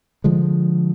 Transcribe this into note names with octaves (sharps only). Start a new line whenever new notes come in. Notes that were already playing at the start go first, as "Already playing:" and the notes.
D3 F3 G#3